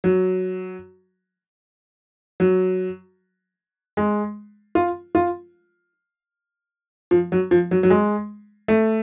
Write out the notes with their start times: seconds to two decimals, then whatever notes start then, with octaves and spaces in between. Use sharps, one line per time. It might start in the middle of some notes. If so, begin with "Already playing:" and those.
0.04 F#3
2.40 F#3
3.97 G#3
4.75 F4
5.15 F4
7.11 F3
7.32 F#3
7.51 F3
7.71 F#3
7.83 F#3
7.90 G#3
8.68 A3